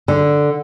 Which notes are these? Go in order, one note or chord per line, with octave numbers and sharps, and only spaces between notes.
D3